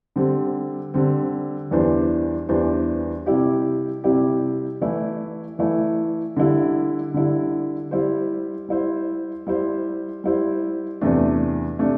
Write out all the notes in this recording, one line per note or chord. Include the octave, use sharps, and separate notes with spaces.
D3 G3 C4
D3 G3 C4
E2 E3 G3 D4 C5
E2 E3 G3 D4 C5
C3 G3 E4 G4
C3 G3 E4 G4
E3 A3 E4
E3 A3 E4
D3 G3 E4
D3 G3 E4
G3 E4 C5
G3 E4 C5
G3 E4 C5
G3 E4 C5
E2 C3 A3 D4
C3 A3 D4